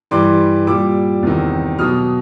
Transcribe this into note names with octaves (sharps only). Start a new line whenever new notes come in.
G2 E3 G3 C6 D6
A#2 G3 D6 E6
E2 C3 D#3
B2 F#3 D#6 F6